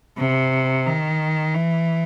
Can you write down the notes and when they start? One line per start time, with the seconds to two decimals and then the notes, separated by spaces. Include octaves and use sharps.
0.18 C3
0.86 D#3
1.55 E3